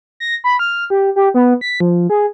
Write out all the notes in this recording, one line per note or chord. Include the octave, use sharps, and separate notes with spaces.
A#6
B5
F6
G4
G4
B3
B6
F3
G#4